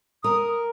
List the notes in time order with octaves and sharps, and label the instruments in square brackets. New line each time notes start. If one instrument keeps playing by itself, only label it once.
[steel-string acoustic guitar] A#4 [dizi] D#6